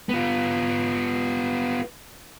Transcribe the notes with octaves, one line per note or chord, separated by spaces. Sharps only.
B3 F4